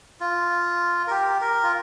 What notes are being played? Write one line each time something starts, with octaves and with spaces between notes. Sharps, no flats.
F4
A#4
G4
A#4
F4